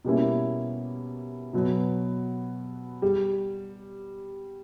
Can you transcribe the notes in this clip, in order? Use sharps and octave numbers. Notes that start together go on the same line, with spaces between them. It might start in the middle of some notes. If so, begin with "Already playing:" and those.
B2 G3 A#3 C#4 E4
B2 F#3 B3
G3